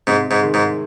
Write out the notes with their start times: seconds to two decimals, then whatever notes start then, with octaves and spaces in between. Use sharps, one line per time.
0.07 G#2 C3
0.31 G#2
0.42 D#3 G#3
0.54 G#2